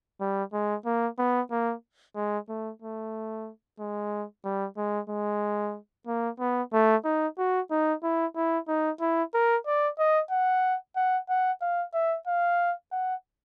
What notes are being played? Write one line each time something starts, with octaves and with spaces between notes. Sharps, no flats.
G3
G#3
A#3
B3
A#3
G#3
A3
A3
G#3
G3
G#3
G#3
A#3
B3
A3
D#4
F#4
D#4
E4
E4
D#4
E4
A#4
D5
D#5
F#5
F#5
F#5
F5
E5
F5
F#5